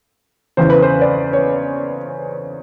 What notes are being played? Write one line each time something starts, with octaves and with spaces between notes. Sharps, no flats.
E2 C#3 E3 C5
B4
C5
D5
C#5